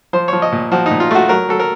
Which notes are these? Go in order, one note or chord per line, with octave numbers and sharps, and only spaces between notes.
F3 C5
F3 C#5
D#5
A#2
F3 F#4
D#4
A#2
F4
A3 F#4
F#3 A#4
F#3 A4
A#4